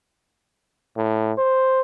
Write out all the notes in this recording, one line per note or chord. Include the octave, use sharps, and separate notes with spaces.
A2
C5